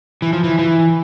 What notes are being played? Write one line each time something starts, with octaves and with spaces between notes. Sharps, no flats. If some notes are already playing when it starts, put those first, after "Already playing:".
E3
F3
E3
E3